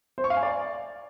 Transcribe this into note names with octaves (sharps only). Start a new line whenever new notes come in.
C5
C#6
F5
G#5
D5